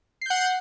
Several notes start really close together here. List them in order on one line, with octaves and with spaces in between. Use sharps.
C7 G6 F#5